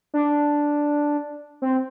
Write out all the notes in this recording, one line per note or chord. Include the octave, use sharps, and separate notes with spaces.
D4
C4